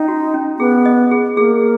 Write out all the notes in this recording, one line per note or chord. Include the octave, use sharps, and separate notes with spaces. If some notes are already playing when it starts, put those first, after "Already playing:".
Already playing: C#4 D#4
F#4
C#4
B3 G#4
D#5
G#4
A#3 G#4